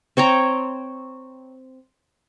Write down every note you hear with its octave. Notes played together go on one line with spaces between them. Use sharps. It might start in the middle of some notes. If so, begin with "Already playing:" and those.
C4 C#5 G5 A#5